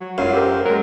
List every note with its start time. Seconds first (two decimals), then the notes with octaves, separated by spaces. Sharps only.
0.01 F#3
0.18 F#2 F#3 F4 F5
0.33 G4 A#4 C5 E5
0.65 F#3 G#3 A#4